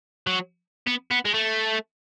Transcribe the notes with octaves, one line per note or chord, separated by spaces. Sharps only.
F#3
B3
B3
G#3
A3